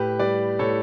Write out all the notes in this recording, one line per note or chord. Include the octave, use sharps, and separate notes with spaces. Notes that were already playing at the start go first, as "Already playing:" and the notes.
Already playing: A2 G4 B4
G3 B4 D5
A2 A4 C#5